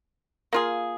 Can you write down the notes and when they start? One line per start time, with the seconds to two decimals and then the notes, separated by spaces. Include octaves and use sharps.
0.53 A#3 F4 G#4